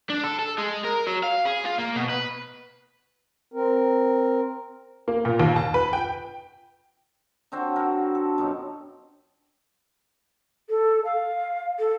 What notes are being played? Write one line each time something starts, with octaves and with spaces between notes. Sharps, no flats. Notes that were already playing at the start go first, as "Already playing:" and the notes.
D4
A4
A4
G#3
A#4
F#3
F5
G#4
F4
A#3
B2
B4
C4 A#4
A#3
A#2
D#2
A5
B4
G5
D3 C4 F#4 C#5
F#4 A#4
A4
F#2 B2 D#4
A4
F5
A4